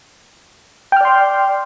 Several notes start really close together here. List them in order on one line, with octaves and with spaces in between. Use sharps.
G5 F6 D5 C6